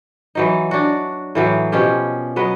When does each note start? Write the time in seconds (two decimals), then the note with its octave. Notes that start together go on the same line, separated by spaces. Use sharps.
0.35 E3 F#3 D#4
0.71 D4 F#4
1.35 A2 E3 F#3
1.72 B2 F3 C#4 G4
2.36 F#3 B3 B4 D#5